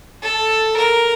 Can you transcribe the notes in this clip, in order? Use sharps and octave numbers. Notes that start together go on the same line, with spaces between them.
A4
A#4